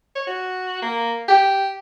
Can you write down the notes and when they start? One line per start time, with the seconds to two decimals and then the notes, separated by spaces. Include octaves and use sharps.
0.15 C#5
0.27 F#4
0.82 A#3
1.28 G4